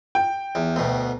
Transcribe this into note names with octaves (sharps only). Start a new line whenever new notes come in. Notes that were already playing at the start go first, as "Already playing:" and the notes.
G5
E2
D2 B2